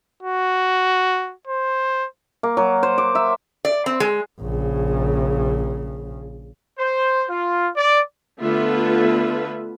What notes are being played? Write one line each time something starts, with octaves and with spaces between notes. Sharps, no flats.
F#4
C5
A#3
F#3
C5
D6
E5
D5
C4
G#3
A#1 C#3
C5
F4
D5
D3 A3 B3 F4 B4 E5